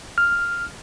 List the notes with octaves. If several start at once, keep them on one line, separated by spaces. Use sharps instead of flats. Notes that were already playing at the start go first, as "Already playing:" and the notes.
F6